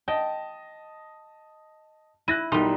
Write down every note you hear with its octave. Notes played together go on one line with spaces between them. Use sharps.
D#5 G5 A5
E4 F#6 A#6 D#7
B1 G3 D#4 A#4 C6